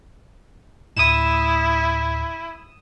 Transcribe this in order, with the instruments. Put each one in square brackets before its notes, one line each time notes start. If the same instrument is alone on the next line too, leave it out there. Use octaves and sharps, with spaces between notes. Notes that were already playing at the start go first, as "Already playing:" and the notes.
[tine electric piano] D2 A2 [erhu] E4 [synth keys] D#6 E7